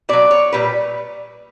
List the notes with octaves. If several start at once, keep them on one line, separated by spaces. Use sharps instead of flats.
B2 F#3 D5
C#5
A#2 G3 B4